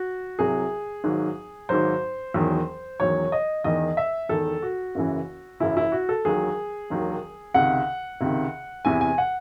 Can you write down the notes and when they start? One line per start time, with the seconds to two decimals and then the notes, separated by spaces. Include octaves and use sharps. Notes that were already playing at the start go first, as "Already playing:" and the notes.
Already playing: F#4
0.39 C2 C3 F#3 G#4
1.04 G#1 G#2 F#3
1.69 G#1 G#2 F#3 C5
2.34 E1 E2 D#3 F#3
3.00 E1 E2 D#3 F#3 C#5
3.32 D#5
3.64 E1 E2 D#3 D#5
3.97 E5
4.29 E1 E2 D#3 A4
4.62 F#4
4.95 F#1 F#2 C#3 E3
5.60 F#1 F#2 C#3 E3 E4
5.77 E4
5.92 F#4
6.09 A4
6.25 E1 D#2 D#3 F#3 G#4
6.90 E1 D#2 D#3 F#3
7.54 C#2 C3 D#3 F#5
8.21 C#2 C3 D#3
8.85 E2 C3 E3 G#5
9.01 G#5
9.18 F#5